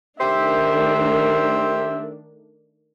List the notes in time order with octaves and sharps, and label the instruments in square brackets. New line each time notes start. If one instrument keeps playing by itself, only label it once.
[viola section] D#3 A3 D4 [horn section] G4 C5 E5